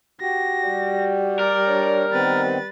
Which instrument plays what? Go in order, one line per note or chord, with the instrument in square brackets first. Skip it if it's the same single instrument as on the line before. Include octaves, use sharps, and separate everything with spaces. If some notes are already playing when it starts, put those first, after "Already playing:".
[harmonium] F#4 G4 [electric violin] A#6
[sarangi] G3
[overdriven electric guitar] A#4 [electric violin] D5
[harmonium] D4 C#5
[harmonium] D#3 B3 C4 [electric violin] B4 A6